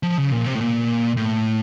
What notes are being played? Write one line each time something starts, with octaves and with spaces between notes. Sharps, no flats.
F3
C#3
A#2
C3
A2
A#2
A2